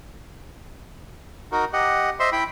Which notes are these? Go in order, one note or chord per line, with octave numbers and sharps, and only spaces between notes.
D#4 F#4 A#4
G4 D#5 F#5
C5 D#5 E5 C6
E4 G5 B5